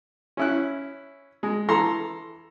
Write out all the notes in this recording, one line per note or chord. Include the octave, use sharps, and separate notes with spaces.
C#4 E4 F#6
G#3
E3 A4 A#5 C6